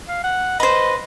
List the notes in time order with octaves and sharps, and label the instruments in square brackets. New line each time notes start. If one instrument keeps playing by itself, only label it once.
[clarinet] F5
F#5
[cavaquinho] B4 C5 [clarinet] D#5